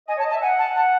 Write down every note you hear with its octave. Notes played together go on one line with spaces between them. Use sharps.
D#5 G#5
C#5 A5
D#5
A5
E5
F#5 G#5
A5
A5